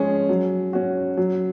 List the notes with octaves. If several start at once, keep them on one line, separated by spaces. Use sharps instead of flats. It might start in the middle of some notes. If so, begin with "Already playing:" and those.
Already playing: F3 G#3 C#4 G#4
F#3
C#4 F#4
F#3